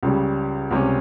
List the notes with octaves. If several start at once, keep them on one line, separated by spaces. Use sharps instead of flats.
C#2 C#3 G3
C#2 C3 G3 C#4